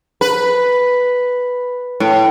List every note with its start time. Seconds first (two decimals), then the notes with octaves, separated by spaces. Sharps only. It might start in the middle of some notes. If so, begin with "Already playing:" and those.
0.21 B4
2.00 A2